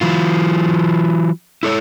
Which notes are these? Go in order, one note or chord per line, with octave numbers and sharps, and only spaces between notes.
E3 F#3 F4
E4 A4 C#5